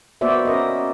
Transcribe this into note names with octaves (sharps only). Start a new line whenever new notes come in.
A#3 B3 F#4 C5 D5 E5
C#4 A#4 D#5